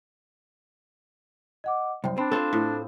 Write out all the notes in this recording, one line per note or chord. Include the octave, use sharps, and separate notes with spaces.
D#5 F#5 D6
C2 F#2 C5 G5
C4 D4 B5
C4 F4 A4 C5
A2